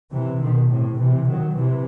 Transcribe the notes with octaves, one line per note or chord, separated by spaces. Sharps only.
C3 E3
B2 D#3
A2 C3
C3 E3
D#3 F#3
C3 E3